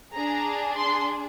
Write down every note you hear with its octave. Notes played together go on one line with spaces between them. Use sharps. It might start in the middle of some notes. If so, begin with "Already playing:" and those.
D4 G#4 A#5
C6